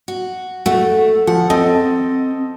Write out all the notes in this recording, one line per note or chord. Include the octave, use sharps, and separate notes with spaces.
F#4
A3 F#4
F3 F#5
C4 A4 D#5